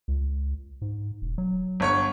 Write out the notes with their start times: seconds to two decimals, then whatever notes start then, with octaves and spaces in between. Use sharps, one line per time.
0.08 C#2
0.82 G#2
1.22 E1
1.38 F#3
1.80 G1 C#5 C#6